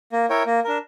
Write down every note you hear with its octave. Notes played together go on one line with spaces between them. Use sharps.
A#3
E4 A#4 C#5 G5
A#3
D4 A#4